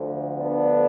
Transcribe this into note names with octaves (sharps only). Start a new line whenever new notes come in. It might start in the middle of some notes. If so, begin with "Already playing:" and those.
Already playing: D2 D3 F3
B3 D4